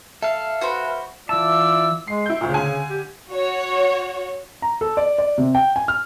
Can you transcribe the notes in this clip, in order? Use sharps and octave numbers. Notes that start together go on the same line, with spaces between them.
A4 E5 F5
F#4 B4 C5 B5
E3 E4 F4 D5 A5 E6
G#3 C7
E4 G6
D2 A#2 C#3
D3 G#5
G4
F#4 C#5
A#5
A4
D5
D5
C3
G5
G#5
F6